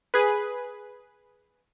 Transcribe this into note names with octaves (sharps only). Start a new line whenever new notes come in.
G#4 B4